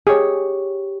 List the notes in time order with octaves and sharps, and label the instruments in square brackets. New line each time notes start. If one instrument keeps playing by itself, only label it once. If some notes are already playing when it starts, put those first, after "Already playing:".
[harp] G4 C#5 [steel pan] G#4